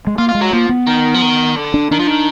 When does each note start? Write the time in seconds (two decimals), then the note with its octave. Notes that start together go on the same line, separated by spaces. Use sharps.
0.07 G#3
0.18 A#3 F4
0.29 F4
0.35 G#3
0.41 F#3
0.53 F3 A#3
0.69 B3
0.87 D#3
1.15 F3
1.22 D#3
1.56 D3
1.74 D4
1.91 D#3 D4
2.00 F3
2.08 D#3